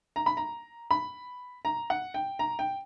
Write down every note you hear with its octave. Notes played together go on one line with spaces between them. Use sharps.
A#5
B5
A#5
B5
A#5
F#5
G5
A#5
G5